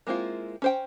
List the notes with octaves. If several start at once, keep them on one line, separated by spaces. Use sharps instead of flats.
G#3 A#3 C4 E4 F4
C#4 C5 G5